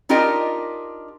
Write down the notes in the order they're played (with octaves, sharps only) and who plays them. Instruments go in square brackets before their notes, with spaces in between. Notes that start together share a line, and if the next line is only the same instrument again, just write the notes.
[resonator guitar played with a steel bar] D4 D#4 F4 G4 A#4 D#5